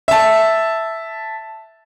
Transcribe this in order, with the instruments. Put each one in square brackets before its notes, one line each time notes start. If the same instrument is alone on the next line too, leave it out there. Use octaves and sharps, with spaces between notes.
[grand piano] E5 A5